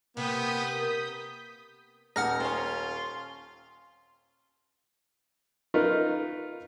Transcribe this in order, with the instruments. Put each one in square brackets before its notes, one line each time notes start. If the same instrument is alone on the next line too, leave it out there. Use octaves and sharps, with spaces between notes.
[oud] C3 [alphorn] A#3 [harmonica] B3 [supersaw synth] D#6 G6 B6
[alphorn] A#4
[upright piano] D#1 [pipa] D#4 [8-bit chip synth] F#5 F6 A#6
[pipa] C4 C#4 [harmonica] F4
[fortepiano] D#4 F4 A#4 B4